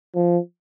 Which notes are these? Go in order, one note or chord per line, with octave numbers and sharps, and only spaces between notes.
F3